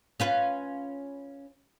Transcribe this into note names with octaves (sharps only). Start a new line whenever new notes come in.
C#4 F4 B4